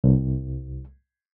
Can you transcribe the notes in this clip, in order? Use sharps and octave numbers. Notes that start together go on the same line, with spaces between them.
C2